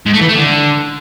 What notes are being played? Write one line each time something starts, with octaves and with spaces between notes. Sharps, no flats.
G#2
A3
E3
A3
D3